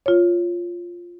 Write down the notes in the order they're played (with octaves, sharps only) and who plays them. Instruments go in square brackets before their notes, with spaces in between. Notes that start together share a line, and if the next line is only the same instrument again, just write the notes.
[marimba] F4 C#5